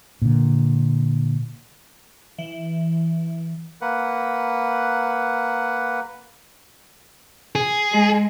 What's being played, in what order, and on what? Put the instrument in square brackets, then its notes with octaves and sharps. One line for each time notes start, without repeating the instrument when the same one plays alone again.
[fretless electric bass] A#2 D3
[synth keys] E3
[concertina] A#3 B4 F#5
[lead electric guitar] G#4
[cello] G#3